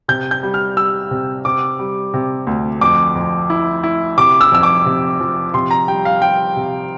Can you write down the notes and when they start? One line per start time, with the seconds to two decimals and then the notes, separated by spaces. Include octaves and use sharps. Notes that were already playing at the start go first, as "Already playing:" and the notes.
0.08 C3 G6
0.31 G6
0.43 G3
0.54 F6
0.77 G3 E6
1.11 C3
1.45 C3 D6
1.79 G3
2.14 C3
2.47 D2
2.81 F2 D6
3.15 F2
3.50 E4
3.84 E4
4.18 C3 D6
4.41 E6
4.52 F2 E6
4.63 D6
4.86 C3
5.20 F3
5.54 C3 C6
5.71 A#5
5.88 G3 G5
6.05 F5
6.22 G3 G5
6.56 C3